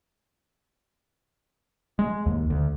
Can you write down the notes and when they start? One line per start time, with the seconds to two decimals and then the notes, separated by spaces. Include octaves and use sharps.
1.99 G#3
2.26 D#2
2.50 D2